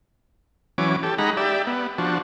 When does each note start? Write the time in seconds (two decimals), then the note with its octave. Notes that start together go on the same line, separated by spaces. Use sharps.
0.78 E3 F#3 C#4 D6
1.03 G4 A4
1.18 G#3 D#4 F#5 A#5 B5
1.37 G4 D5 E5
1.67 B3
1.98 F3 D4 F#4